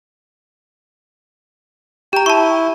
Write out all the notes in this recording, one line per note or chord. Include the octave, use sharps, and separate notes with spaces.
G4 G5 A#5
E4 A5 C#6